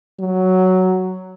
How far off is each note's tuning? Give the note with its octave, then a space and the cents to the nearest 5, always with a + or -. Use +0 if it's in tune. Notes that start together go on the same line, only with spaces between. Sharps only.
F#3 +5